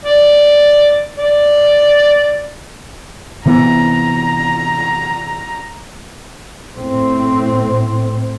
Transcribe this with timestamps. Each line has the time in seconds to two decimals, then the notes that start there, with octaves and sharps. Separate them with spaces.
0.05 D5
1.18 D5
3.46 C3 E3 B3 A#5
6.76 A2 C4